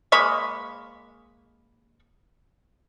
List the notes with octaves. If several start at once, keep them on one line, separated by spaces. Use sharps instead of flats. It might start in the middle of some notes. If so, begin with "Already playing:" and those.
G#3 A#3 B5 C#6